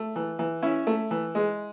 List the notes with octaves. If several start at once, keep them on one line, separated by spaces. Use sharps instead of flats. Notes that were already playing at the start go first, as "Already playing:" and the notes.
Already playing: A3
E3
E3
C#4 E4
A3
E3
G#3